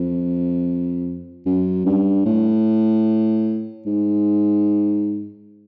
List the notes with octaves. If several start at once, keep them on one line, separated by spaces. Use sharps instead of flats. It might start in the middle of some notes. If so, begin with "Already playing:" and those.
Already playing: F2
F#2
G2
A2
G#2